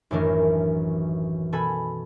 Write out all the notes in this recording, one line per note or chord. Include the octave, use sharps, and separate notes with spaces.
A1 F#2 D#3 E3 D4 A#4
B2 A4 G#5 B5